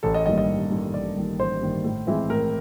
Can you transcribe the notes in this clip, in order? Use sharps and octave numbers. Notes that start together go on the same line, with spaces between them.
A1 A4
D#5
G2 D#3 G3 A#3 D#5
D#5
A1
G2 D#3 G3 A#3
A1 D5
G2 D#3 G3 A#3
A1 C5
G2 D#3 G3 A#3
A2
E3 G#3 C4 E4
A2 A#4